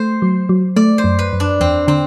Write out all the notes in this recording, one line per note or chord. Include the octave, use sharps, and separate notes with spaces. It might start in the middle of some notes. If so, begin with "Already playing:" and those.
Already playing: A3 C5
F#3
F#3
A3 D5
C5
F#2
B4
F#2
D4
E2 C4
D3 C4